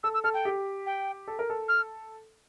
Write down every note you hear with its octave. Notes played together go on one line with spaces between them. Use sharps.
A4 E6
E6
A4 F6
G5
G4
G5
A4
A#4
A4
F6